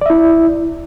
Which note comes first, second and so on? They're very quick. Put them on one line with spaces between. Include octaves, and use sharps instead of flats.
D5 E5 E4